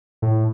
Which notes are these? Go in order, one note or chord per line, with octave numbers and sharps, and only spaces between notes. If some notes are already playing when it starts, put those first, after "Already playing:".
A2